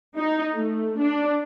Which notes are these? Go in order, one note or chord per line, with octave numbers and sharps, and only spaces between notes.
D#4
A3
D4